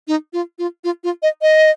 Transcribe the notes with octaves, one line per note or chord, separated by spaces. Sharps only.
D#4
F4
F4
F4
F4
D#5
D#5